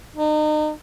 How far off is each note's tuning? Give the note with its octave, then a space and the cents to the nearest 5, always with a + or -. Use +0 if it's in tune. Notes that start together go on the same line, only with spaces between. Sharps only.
D#4 -35